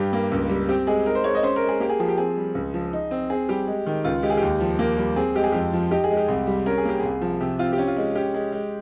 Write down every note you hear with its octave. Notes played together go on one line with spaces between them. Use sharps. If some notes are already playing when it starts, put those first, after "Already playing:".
Already playing: G2 G3 G4
A#3
C#2
G3
C4 G4
G#3 G#4
D#4 A#4
C5
G#3 C#5
D#5
C#4 C5
A#4
G#3
G#4
A#3 G4
G#4
F3 G#4
G4
C4 G#4
G3
C#2
F3
D#4
C4
C4 G#4
G3 G4
G#3
D#3
C#2 F4
G#3 G4
G#4
G4
D#2
F3
A#3
G3
C4 G#4
G#3 G4
G#4
F2 G4
F3
D#4 G4
G#4
G#3
G4
C2
G3
C#4 A#4
G#4
A#3 G4
C2 G#4
F3
C3 G4
C4 F4
G4
C#4
F4
G#3
C#4 G4
G#3
G#3